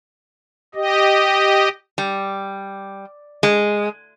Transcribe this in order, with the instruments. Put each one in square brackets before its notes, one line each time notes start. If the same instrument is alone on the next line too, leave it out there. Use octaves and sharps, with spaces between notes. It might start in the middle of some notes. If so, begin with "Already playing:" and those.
[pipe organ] G4 D#5
[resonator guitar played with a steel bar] G3
G#3